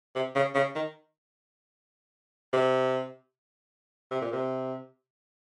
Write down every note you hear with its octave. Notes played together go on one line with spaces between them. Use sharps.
C3
C#3
C#3
D#3
C3
C3
A#2
C3